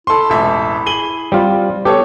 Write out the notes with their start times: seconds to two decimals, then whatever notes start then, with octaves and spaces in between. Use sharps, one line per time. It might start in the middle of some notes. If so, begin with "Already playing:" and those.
0.07 E4 A4 C6
0.30 E1 A1 E5
0.86 G#4 D#7 F#7 G7
1.32 G3 C4 F4
1.85 B3 G4 A4 C#5